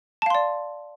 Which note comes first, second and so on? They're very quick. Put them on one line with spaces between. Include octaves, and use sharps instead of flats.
A5 F5 C6 D5